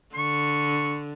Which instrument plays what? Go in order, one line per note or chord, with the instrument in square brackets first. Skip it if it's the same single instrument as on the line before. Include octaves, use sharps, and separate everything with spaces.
[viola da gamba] D3 [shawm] C#6